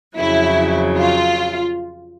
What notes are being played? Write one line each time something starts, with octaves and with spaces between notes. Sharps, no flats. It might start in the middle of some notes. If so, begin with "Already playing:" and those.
F2 C#3 F#3 E4
F4